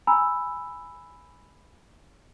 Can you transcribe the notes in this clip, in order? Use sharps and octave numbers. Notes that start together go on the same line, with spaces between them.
G#5 A#5 B5 E6